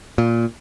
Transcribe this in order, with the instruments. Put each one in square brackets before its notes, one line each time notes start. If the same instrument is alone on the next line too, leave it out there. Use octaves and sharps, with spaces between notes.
[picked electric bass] A#2